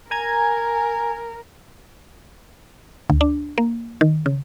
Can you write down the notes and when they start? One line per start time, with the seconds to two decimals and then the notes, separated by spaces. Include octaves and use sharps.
0.11 A#4 G#5 A#5 G#6
3.10 D2
3.21 D4
3.58 A#3
4.01 D#3
4.26 C#3